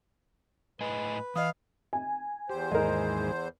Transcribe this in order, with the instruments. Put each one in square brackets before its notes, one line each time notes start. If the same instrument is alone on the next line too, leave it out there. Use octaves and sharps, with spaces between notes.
[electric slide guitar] A2 D#5 G#5 [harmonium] B4
[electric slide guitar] E3 [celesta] D#5 D#6 [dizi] F5
[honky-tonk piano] G#5
[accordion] E2 C5 [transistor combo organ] G4
[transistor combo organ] D#2 G#2 G#4 [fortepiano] A#4 D#5